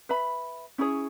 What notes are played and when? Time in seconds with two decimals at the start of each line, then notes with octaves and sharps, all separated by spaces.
0.09 B4 E5 B5
0.78 C#4 E4 G#4 C#5